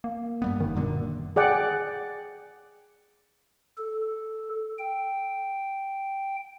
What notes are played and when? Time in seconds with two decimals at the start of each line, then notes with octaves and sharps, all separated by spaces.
0.04 A#3
0.42 G2 G3 B3
0.60 F#1 D#3
0.76 F#2 A#2 D3
1.36 G#4 D5 F#5 G5
3.78 A4
4.78 G5